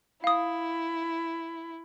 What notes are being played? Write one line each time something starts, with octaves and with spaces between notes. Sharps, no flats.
E4 F5 D#6